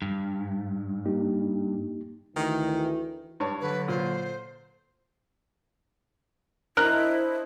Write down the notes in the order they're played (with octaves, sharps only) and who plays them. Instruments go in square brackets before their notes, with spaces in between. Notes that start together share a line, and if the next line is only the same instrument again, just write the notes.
[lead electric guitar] G2
[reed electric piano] A#3 D#4 G4
[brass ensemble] D2 E3 [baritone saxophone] D#3
[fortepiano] G2 C#5
[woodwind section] D3 F#3 [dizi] B4
[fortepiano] A#2 [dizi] C5
[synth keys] D4 C5 D#5 [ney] E4 [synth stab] A#4 [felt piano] F#6